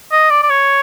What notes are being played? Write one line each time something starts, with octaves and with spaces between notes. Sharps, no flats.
D#5
D5
D5
C#5